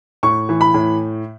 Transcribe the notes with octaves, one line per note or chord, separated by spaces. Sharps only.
A2 C#6
E3
B5
A2